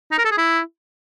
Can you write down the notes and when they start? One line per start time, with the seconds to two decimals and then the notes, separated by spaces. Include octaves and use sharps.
0.12 D#4
0.18 A#4
0.25 A4
0.31 G#4
0.38 E4